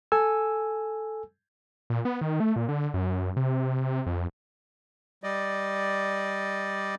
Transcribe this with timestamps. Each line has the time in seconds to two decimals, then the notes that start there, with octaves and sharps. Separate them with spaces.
0.12 A4 G#5 E6
1.90 A#2
2.05 B3
2.21 D#3
2.40 A3
2.56 A#2
2.69 D3
2.94 F#2
3.36 C3
3.80 C3
4.06 F2
5.23 G3 D5 D#5